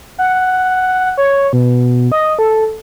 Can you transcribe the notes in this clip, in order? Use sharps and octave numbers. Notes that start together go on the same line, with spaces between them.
F#5
C#5
B2
D#5
A4